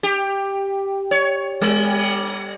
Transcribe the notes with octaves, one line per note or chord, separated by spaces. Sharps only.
G4
C#5
G3